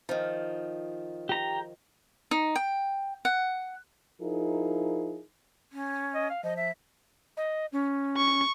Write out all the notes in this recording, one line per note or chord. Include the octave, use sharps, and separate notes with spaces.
D#3 F3
G4 A#5
D#4
G5
F#5
F3 D#4 E4 G#4 A#4
C#4
D#5
F5
F3 D#5
E5
D#5
C#4
C#6